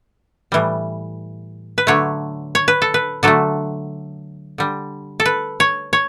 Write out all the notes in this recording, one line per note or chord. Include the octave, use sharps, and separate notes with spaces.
A2 E3 G3
B4
D3 F#3 A3 C#5
C#5
B4
A4
B4
D3 F#3 A3 A4
D3 G3
A4
B4
C#5
C#5